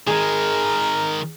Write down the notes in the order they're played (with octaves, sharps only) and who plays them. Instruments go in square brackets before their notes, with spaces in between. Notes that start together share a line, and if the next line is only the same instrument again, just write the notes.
[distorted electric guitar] D#3 G#3 [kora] G#4 [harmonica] A#4